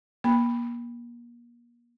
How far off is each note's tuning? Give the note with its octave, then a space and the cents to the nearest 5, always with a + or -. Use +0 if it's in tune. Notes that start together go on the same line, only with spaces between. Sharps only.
A#3 +35 B5 +0